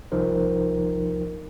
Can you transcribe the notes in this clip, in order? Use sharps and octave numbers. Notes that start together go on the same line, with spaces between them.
C2 F3 D#4 A#4 C5